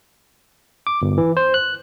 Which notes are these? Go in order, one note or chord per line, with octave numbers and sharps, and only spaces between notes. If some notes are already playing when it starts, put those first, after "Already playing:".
D6
G1
E3
C5
F#6